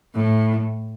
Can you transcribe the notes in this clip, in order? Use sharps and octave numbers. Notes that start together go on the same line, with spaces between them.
A2